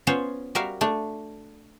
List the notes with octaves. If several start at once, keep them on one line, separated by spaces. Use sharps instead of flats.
B3 C#4 F4 C5 C#5
G3 F#4 A#4 E5 F5
A3 D4